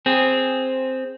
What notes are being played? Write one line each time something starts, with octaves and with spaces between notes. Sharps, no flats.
C4 G#4